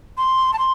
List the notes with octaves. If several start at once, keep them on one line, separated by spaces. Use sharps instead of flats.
C6
A5
C6